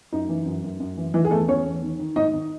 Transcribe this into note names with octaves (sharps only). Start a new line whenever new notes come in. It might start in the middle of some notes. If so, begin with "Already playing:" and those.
F#2 D#4
E3
F#2
F#2
F#2
E3
D#3 E3 E4
G#4
E2 A3 A4
E2 C#4 C#5
E2
D#3
D#3
G#2 D#4 D#5
D#3